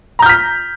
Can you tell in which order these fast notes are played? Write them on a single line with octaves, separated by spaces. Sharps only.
A#5 G6 F6 B6